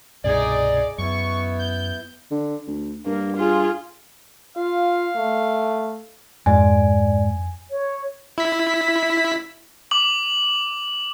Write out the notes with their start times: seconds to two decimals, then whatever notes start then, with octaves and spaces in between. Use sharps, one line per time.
0.24 C2 G2 B2 D#4 G#4 D5
0.98 F#2 B3 E4 C#6
1.59 G6
2.31 D3
2.67 D2
3.06 G2 A#3
3.37 F4 G#4
4.57 F4 F5
5.16 A3
6.46 F2 G#2 D5 G#5
7.70 C#5
8.38 E4 B6
9.91 D6 F#7